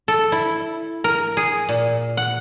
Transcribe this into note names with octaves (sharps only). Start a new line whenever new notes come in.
A4
E4
A#4
G#4
A#2
F#5